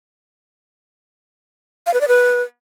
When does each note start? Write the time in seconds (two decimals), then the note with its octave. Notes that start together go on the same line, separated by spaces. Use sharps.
1.87 F5
1.94 B4
2.01 D5
2.08 B4